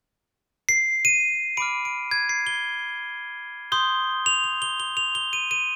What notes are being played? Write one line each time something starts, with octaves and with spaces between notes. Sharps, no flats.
C7
D#7
B5 D6 F6 D7
D7
G#6
C7
G7
C6 D#6 G6 G7
F7
F7
G7
G7
F7
G7
D#7
D#7